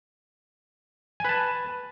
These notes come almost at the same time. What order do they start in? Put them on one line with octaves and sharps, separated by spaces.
G#5 B4 A5